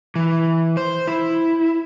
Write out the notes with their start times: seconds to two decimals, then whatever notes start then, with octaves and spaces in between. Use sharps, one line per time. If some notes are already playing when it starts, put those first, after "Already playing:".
0.16 E3
0.77 C5
1.07 E4